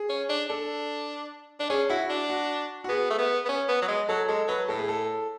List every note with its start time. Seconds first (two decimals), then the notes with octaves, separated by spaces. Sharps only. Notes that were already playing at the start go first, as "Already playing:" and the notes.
Already playing: G#4
0.10 C#4
0.29 D4
0.50 D4 A4
1.60 D4
1.70 C#4 G#4
1.90 E4 F#4
2.10 D4
2.30 F#4
2.84 F#4
2.89 B3 G#4
3.10 A3
3.19 B3
3.45 B3
3.49 C#4
3.69 B3
3.82 F#3
3.88 G#3
4.09 F#3 A4
4.28 G#3 A4
4.48 F#3 B4
4.68 A2 A4
4.79 G#4
4.89 A4